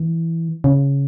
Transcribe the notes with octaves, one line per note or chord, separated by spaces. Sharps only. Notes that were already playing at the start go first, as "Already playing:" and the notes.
Already playing: E3
C#3